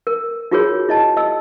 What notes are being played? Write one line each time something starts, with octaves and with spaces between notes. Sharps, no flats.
A#4
D#4 F4 F#4 G#4 A#4 C#5
E4 D#5 A5
D#5 E6